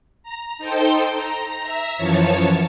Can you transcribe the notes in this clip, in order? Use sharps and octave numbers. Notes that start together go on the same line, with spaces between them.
A#5
D#4 A4 C5 G5 C6
A#5
E5 A#5
F#2 E3 F3 C#5 A5 C#7